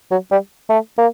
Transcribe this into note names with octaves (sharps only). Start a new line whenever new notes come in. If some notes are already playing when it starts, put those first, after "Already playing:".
F#3
G3
A3
A#3